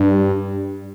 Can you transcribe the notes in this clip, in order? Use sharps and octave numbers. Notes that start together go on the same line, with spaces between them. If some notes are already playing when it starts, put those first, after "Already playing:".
Already playing: G2